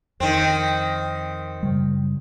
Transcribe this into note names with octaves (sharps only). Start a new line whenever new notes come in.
F2 D#3 C4
F#2 C#3 G3